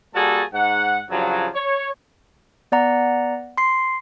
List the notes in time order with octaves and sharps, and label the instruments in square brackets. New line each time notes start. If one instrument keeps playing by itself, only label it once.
[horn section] G3 A#3 F#4 G#4 A4 A5
G#2 F#5
G2 C#3 F3 F#3
C#5
[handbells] B3 D5 F#5 A#5
C6 C7